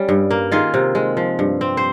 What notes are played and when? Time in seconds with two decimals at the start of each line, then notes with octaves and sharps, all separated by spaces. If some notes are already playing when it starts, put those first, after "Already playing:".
Already playing: G3 C#4
0.09 G2
0.31 A#3
0.52 D#3 F4 G#4
0.74 C3
0.95 G#3
1.17 F3
1.39 G2
1.61 C4
1.77 C5